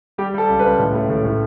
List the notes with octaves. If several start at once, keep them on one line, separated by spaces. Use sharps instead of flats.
G3 G4
G3 A4
C#2
C#2 B4
A2
A3
A2
A2